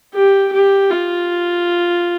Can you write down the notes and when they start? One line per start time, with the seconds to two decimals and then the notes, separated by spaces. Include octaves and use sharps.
0.14 G4
0.53 G4
0.91 F4